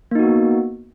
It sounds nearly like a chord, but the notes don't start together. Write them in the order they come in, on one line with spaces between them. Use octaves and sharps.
A#3 D#4 F#4 B3